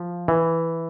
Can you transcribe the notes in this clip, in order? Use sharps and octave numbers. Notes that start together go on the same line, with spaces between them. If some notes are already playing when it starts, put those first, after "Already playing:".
Already playing: F3
E3